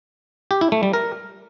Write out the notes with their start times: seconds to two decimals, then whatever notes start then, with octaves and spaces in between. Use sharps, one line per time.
0.51 G4
0.61 E4
0.72 A3
0.83 G3
0.93 A#4